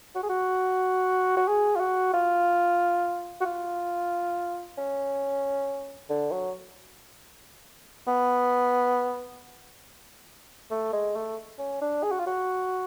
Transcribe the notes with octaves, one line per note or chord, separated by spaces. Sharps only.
F#4
G#4
F#4
F#4
G#4
F4
F#4
F4
F#4
F4
C#4
D3
F#3
B3
A3
G#3
A3
C#4
D4
G#4
F#4
F4
F#4